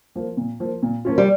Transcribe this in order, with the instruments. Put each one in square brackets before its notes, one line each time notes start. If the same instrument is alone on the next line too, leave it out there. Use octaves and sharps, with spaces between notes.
[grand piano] F3 A#3
A#2
F3 A#3
A#2
F3 A#3 C#4 F4
[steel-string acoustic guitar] G3